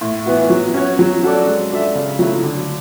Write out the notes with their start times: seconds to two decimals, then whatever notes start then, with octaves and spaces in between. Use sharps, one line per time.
0.01 A2
0.26 E3 B3 F#4
0.50 F#3
0.74 C#4 F#4 C#5
0.99 F#3
1.23 C#4 F#4 A4 D5
1.47 G#3
1.71 D4 F#4 A4 E5
1.95 C#3
2.19 F#3 A3 E4
2.43 D3